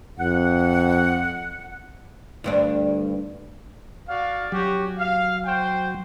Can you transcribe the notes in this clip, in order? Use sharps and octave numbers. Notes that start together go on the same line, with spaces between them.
F2 F#5
D2 G2 D4
F#4 D5 F5
F#3 C#4 F#4 G4
F5
F#4 C5 G5